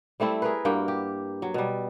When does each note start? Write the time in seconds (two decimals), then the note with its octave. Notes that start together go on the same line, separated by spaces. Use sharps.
0.20 G3 A3 C4 E4
0.42 G#4 A#4 B4
0.65 G2 A#3 F#4 G5
0.88 G4
1.42 F#3
1.54 B2 G3